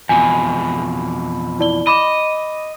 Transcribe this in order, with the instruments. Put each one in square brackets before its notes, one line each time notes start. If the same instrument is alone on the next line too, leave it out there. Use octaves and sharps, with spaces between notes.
[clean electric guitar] F2 B2 E3 [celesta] G#5
[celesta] E4 D5 G7
[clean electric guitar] D#5 [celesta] B5 D6 E7